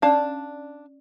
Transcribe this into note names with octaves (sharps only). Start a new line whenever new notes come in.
C#4 D4 D5 F5 A5 D6